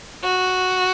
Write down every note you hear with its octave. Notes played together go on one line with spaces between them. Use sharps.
F#4